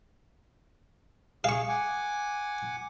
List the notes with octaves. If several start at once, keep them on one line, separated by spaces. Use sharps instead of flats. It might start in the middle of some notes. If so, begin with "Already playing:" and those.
G#4 F5 C#6
F#5 G#5 D6